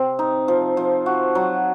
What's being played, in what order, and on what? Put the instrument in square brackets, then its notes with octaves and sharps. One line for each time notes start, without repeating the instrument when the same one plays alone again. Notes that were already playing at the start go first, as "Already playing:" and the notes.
Already playing: [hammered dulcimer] C3 C4
D#4
F3
F3
F#4
F#3